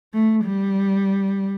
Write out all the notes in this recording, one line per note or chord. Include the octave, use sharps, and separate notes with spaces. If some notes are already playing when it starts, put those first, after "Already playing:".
A3
G3